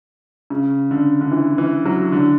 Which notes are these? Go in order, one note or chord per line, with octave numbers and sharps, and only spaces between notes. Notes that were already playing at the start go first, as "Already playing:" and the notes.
C#3
D3
D3
E3
E3
F#3
D3